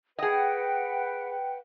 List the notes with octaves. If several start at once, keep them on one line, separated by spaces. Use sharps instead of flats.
G#4 B4 D#5 F#5 G5